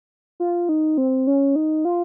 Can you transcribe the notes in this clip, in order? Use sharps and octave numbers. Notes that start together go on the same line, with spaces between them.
F4
D#4
C4
C#4
D#4
F4